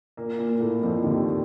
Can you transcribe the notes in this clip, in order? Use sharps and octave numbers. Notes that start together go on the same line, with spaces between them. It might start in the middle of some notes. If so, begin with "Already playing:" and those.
A#2 A#3
A#2 A#3
A2 A3
F2 F3
D#2 D#3